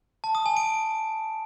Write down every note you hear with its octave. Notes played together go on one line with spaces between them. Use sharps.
A5
D#6
G#5
D7